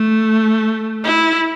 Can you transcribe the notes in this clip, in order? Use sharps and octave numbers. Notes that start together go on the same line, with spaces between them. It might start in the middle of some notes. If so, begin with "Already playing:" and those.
Already playing: A3
E4